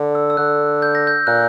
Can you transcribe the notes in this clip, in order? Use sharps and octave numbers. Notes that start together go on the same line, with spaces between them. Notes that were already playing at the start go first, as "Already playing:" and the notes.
Already playing: D3
E6
E6
D3 F#6
G6
A#6
G6
A#2 F#6